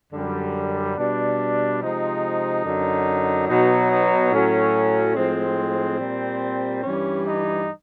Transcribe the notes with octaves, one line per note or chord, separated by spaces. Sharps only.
F#2 D3 G3
B2 G3 D4
C3 F3 G#3 D#4
F#2 D3 F#3
B2 F#3 D#4
D#4
A2 F#3 C#4
A2 F3 G#3 C4
A#2 G3
G2 E3 G3 C#4
D#4